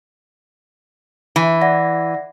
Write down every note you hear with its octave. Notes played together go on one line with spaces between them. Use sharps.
E3
D5 F#5 A#6